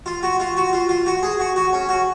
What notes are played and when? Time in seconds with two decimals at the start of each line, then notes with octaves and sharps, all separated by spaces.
0.06 F4
0.23 F#4
0.40 F4
0.57 F#4
0.73 F4
0.89 F4
1.06 F#4
1.23 G#4
1.40 F#4
1.56 F#4
1.73 C#4
1.89 F#4